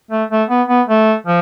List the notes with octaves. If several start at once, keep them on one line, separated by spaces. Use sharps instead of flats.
A3
A3
B3
B3
A3
F3